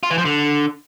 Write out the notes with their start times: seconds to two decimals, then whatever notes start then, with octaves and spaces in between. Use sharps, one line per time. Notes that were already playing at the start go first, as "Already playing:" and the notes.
0.03 F4
0.11 E3
0.18 F3
0.25 D3